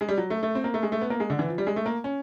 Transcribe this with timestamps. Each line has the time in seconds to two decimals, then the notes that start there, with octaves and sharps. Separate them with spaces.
0.01 G#3
0.09 G3
0.18 F#3
0.30 A3
0.43 A3
0.55 C4
0.64 A#3
0.74 A3
0.83 G#3
0.92 A3
1.01 B3
1.10 A#3
1.20 G#3
1.30 D3
1.39 E3
1.49 F3
1.58 G3
1.67 G#3
1.76 A3
1.86 A#3
2.04 C#4